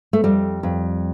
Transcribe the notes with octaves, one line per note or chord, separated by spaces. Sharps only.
A3
F2 G3
F2